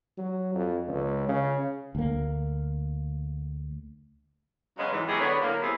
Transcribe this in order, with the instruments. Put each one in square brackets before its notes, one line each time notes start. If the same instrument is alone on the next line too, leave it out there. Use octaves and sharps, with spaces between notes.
[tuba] F#3
F2
C#2
C#3
[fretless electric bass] D2 A#3
[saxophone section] C#3 F#3 G#3 B3 C#4
G#2 E3
D#3 F#3 B3 E4 G4 G#4
D3 B3 C#5
A2 D3 F#3 A#3
A2 C3 B3 C4 E4 G#4